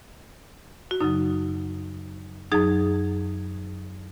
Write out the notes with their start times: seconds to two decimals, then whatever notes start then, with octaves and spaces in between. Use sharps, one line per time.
0.91 F#4
1.01 F#2 C#3 F#3 D#4
2.52 F#2 F#3 D#4 G#4